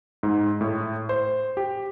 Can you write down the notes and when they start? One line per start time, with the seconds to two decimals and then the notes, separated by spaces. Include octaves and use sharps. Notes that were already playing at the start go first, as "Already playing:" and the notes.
0.23 G#2
0.61 A2
1.09 C5
1.57 G4